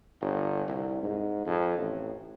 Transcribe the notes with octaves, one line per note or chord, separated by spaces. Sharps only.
G1
C2
G#2
F2
A1